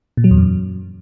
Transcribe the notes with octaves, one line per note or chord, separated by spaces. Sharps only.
A#2
F#3
E2
F#2